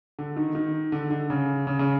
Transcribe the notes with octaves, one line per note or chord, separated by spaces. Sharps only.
D3
D#3
D#3
D3
D3
C#3
C#3
C#3